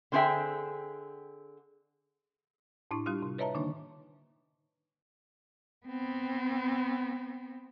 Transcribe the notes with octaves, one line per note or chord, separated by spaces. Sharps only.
D3 C4 G#4 A#4 E5 G5
A2 D4 E4 C#6
G3 D4 F4 G4
C3
B4 C#5 D#5 E5 A5 A#5
D3 D#3 A#3 D4 D#4
B3 C4